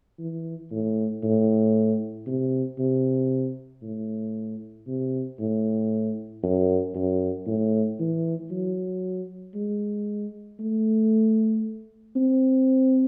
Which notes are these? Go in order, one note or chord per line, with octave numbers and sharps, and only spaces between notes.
E3
A2
A2
C3
C3
A2
C3
A2
F#2
F#2
A2
E3
F#3
G#3
A3
C4